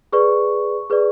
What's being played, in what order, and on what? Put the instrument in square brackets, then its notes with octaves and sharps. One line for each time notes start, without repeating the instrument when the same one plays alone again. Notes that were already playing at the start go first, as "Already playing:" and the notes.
[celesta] G#4 B4 D5 C#6
G#4 B4 D5